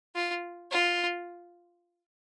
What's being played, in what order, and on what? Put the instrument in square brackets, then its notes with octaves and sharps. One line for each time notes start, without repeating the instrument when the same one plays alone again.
[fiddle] F4
F4